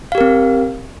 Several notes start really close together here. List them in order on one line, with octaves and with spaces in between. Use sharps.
F5 G4 A#4 C4